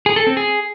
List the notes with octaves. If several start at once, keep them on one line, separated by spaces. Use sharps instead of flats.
G#4
A4
C4
G#4